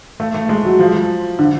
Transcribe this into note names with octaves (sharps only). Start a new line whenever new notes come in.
A3
A3
G#3
F#3
F3
D3